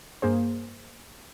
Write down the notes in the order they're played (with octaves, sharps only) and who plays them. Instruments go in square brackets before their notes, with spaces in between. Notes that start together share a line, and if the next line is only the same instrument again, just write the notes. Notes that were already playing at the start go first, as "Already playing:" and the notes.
[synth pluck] G2 A#3 G#4 C5